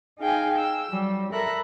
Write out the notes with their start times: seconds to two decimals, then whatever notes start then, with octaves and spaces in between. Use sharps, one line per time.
0.19 D#4 G#4 F5 G5 G#5
0.55 G5 E6
0.88 F#3 G3
1.33 A4 A#4 E5 A#5 B5 F#6